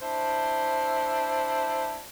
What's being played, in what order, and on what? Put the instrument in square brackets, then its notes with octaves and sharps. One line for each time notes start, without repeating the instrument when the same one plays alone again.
[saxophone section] D4 E4 C5